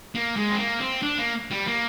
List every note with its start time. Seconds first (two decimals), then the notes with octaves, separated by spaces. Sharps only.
0.15 A#3
0.37 G#3
0.51 C4
0.58 A#3
0.80 C4
1.02 D4
1.18 A#3
1.51 G3
1.67 A#3